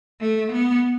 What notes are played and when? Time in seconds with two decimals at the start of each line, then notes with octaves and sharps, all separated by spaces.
0.21 A3
0.52 B3